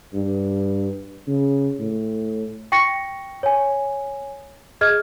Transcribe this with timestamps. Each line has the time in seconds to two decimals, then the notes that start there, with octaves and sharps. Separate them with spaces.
0.14 G2
1.28 C#3
1.80 A2
2.72 G5 C#6 A#6 C#7
3.43 C#5 G#5
4.81 G#4 D#5 F6 G#6